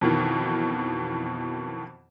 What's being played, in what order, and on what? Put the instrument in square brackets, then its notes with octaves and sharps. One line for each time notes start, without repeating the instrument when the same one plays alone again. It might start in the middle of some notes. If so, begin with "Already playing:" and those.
[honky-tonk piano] F2 B2 D#3 E3